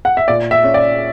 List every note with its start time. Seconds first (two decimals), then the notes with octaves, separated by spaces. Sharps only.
0.05 F#5
0.17 E5
0.28 A#2 D5
0.51 E5
0.64 C#4
0.74 D5